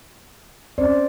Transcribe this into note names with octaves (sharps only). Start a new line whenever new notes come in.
C4 C#4 C5 D5